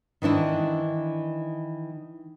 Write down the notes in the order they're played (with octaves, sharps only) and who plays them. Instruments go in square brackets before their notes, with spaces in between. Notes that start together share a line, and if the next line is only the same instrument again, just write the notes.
[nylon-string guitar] D#3 E3 D4 E4